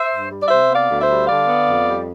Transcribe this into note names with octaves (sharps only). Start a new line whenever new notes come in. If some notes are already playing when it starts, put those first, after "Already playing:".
Already playing: C5 E5
G2
G3
D5
C3 C5 E5
B3
D5 F5
D2
C5 E5
G3
D3 D5 F5
B3
F2
G3